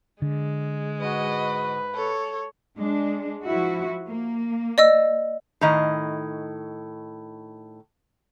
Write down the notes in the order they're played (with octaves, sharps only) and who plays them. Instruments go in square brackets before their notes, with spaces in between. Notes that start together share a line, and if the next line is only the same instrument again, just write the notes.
[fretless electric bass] D3 [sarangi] G#3
[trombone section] G#2 B4 [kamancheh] F#4 D#5
[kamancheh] A4 C#5
[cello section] G#3 D4
F3 E4 F#4
A#3
[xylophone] D5 D#5 E6
[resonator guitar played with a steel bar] A2 D#3 D#5